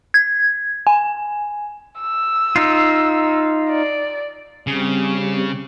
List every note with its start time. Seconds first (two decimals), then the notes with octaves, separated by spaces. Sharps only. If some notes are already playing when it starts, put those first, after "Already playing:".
0.14 G#6
0.87 G#5
2.01 E6
2.56 D#4 F4
3.70 D5
4.67 C#3 G3 C4 G4